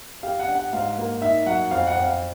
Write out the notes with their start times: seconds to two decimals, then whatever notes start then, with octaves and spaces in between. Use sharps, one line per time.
0.23 G4 F5
0.39 F#5
0.48 D4
0.55 F#5
0.73 G#2 F5
0.97 A#3
1.21 D#4 E5
1.46 F#3 F#5
1.71 F2 F5
1.87 F#5
1.95 F2
2.03 F5